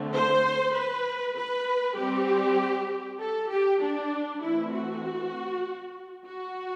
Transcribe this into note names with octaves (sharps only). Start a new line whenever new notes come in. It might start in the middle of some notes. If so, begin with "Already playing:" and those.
Already playing: D3 A3 C4
C5
B4
B4
G3 C4 G4
A4
G4
D4
E3 A3 C4 E4
F#4
F#4